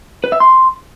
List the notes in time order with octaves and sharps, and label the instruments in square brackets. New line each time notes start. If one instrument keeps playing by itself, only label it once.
[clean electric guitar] B4
E5
C6